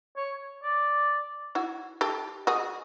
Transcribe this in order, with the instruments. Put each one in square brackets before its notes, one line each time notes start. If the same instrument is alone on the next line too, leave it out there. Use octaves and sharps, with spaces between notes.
[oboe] C#5
D5
[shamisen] E4 F#4
G4 A4
[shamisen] F#4 G#4 [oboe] D#5